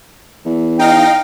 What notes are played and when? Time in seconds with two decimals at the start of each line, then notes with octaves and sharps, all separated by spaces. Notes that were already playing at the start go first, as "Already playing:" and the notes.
0.45 E2
0.79 D#4 F5 G5 A#6